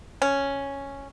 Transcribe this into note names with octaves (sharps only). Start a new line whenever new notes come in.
C#4